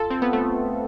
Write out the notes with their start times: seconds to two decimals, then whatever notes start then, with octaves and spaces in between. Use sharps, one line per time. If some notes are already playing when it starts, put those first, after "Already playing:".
Already playing: F4 A4
0.10 C4
0.22 B3
0.33 A3